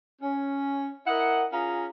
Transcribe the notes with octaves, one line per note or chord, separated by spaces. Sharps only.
C#4
E4 A#4 D#5 F#5
C#4 F4 G#4 F5 A#5